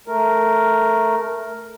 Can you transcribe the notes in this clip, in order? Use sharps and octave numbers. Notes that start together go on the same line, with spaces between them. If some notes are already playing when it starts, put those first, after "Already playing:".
A3 A#4